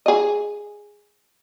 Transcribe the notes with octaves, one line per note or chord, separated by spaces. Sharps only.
G#4 D#5